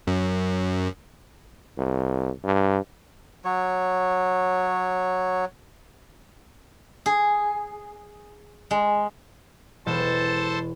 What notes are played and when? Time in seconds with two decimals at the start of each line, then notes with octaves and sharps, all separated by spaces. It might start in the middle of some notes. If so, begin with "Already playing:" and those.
0.07 F#2
1.78 C2
2.45 G2
3.45 F#3 C#5
7.06 G#4
8.71 G#3
9.86 E1 A4 C5 A5